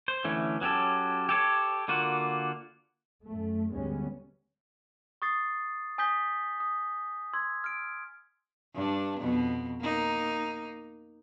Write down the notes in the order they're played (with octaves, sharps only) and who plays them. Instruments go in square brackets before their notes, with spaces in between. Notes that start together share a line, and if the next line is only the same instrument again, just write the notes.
[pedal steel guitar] C5
D3 E3 A3 C#4
F#3 C#4 G4 A4
G4 A4 C#5
D3 A#3 F4 F#4
[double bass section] F#2 A3
D2 G#2 G3 G#3 B3 C#4
[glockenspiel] C#6 D#6 A6 C7
G#5 D#6 G6 B6 G7
D#6
C6 E6 G#6
F6 D7
[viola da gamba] G2 D4
F2 B2
A#3 D#4